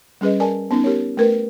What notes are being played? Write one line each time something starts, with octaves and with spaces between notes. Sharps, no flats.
G3 C#4 G#4 B4 D#5
A#4 D5 G#5 A5
B3 C#4 D#4
G4 A#4 C#5
A3 A#4 B4